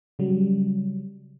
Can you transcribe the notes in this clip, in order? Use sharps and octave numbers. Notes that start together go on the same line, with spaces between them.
C#3 F#3 G3